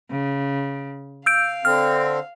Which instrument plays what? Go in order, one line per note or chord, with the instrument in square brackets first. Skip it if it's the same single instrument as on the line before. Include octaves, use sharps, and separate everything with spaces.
[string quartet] C#3
[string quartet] F5 [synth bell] E6 G6 D7
[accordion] D3 C4 [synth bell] F6